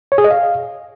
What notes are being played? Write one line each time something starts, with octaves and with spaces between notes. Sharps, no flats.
C#5
G#4
D#5
F5